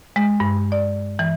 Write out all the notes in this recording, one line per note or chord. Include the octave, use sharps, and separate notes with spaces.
G#3
G2
D5
E3